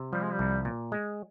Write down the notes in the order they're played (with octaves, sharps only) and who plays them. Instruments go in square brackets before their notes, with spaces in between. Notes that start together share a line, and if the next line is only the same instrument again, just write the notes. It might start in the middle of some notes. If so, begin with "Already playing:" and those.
Already playing: [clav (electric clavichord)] C3
[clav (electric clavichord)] F3 [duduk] G3
[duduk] G#3
G3
[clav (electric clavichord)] C2
A#2
G#3